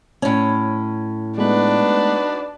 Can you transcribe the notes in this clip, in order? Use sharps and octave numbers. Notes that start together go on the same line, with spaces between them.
A2 C#4
G#3 A3 B3 D4 D#4 F#4 B4